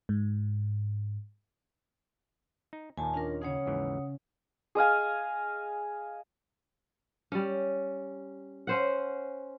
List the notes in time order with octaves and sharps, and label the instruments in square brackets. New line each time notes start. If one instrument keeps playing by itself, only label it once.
[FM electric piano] G#2
[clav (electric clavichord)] D#4
[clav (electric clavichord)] D#2 A#2 D#3 [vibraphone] G#5 A5
[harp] C#4 [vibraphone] D4 F4 A#4
[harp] C#3 C#4 G#4 [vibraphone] C#5 F#5 D#6
[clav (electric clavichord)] D#2 G#2 E3
[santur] G#4 D#5 F5 G#5
[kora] G3 C#4
C#4 C5 F#5